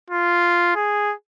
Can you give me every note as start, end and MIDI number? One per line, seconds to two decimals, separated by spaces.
0.10 0.75 65
0.76 1.14 68